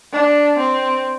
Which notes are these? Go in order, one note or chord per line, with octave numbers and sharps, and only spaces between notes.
D4
C4